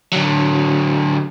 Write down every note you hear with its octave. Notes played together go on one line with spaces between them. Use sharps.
D3 F#3